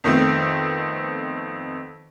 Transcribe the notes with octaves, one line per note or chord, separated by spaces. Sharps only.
F2 D#3 A3 B3 C4